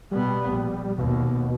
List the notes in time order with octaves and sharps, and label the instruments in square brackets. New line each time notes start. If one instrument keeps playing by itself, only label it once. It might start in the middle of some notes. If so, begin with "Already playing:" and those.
[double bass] B2 B3 [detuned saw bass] G3
[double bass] A#1
[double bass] D#2 [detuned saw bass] B2